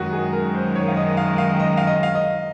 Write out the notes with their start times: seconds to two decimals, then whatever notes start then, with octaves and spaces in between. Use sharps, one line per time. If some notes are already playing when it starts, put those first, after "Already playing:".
Already playing: F#2 D#3 G#3 F#4
0.13 G#4
0.33 A#4
0.55 C5
0.75 C#5
0.88 F5
0.97 D#5
1.17 F5
1.38 F5
1.60 D#5
1.77 F5
1.87 D#5
2.03 F5
2.15 D#5